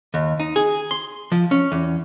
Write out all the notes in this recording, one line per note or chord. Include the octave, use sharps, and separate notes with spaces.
D#2
D#4
G#4
C6
F3
C#4
E2